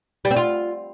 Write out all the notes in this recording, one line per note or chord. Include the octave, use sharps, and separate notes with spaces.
G3
C4
F4